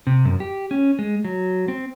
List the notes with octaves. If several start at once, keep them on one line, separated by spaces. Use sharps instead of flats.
C3
F#2
G4
C#4
G#3
F#3
C4